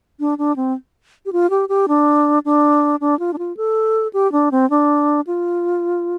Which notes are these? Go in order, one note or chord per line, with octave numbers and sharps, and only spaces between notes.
D4
D4
C4
G4
F4
G4
G4
D4
D4
D4
F4
D4
F4
A4
G4
D4
C4
D4
F4